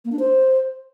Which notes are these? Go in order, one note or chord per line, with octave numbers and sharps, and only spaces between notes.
A#3
D4
C5